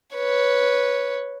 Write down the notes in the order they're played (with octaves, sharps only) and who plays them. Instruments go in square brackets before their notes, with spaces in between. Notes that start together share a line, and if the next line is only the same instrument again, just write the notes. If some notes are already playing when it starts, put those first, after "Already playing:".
[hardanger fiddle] B4 C#5